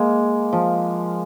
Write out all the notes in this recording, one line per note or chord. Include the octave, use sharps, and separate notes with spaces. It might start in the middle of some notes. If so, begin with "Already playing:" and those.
Already playing: G#3 A#3
F3